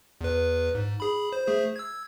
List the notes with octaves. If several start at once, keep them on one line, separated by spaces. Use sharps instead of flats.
E2 B4
G#2
G#4 B5
C5
A3 G#4 C5
E6 G#6